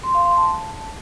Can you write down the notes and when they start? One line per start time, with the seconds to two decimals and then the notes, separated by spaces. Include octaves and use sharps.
0.03 C6
0.15 F5
0.26 C6
0.37 A5